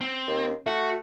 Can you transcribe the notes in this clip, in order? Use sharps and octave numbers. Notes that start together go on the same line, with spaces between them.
C4
D#2
A3 F#4